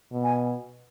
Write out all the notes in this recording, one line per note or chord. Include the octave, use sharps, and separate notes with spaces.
B2
G#5